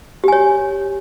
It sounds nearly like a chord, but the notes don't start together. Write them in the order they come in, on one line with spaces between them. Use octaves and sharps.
G4 G#5 C#5